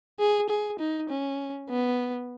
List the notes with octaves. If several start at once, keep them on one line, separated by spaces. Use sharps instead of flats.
G#4
G#4
D#4
C#4
B3